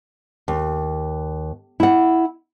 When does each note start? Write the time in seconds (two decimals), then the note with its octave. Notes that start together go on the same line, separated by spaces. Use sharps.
0.48 D#2
1.80 E4 F#5